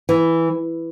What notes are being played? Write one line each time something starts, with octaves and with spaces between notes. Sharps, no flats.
E3